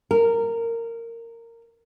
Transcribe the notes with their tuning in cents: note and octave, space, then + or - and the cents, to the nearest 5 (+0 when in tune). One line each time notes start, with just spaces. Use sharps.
A#4 -15